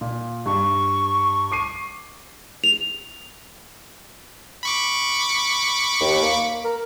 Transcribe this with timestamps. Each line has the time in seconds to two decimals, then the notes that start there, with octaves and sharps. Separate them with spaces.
0.01 A#2
0.46 G2 C#6
1.52 D6 C7 D#7
2.64 F7
4.63 B5 C#6 D6
6.01 D#2
6.22 A#3
6.64 A#4